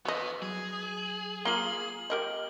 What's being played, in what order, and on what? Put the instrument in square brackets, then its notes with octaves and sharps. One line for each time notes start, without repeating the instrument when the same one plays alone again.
[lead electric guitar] E3 B3 [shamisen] F#4 D#5
[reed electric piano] F#3 [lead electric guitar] G#4
[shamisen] A#3 F4 [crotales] F#7 G7
[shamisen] G4 A#4 D#5